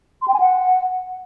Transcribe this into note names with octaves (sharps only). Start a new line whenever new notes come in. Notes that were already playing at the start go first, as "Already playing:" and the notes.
C6
G5
G#5
F#5